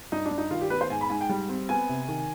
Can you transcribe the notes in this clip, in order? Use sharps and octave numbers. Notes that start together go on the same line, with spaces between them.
G2 D#4
D4
G2
D#4
D#3 F4
G4
B3 B4
C5
G#2 G#5
B5
G#2 G#5
G5
G3
C4
B3 G#5
C3
D#3